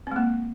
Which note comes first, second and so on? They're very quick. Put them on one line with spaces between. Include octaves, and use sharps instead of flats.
C4 G#3 A#3